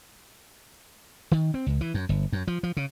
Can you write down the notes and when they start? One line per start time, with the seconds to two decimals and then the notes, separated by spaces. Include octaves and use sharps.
1.32 D#3
1.54 C4
1.66 C#2
1.81 E3
1.94 F#2
2.09 G1
2.33 F#2
2.48 F3
2.63 F3
2.77 C#3